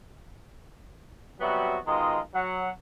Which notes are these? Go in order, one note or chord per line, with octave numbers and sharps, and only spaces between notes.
F#3 G3 B3 C4 F#4 E5
B2 D#3 G#3 F4 D#5 A#5
F#3 F#5